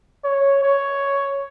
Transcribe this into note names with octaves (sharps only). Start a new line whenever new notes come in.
C#5
C#5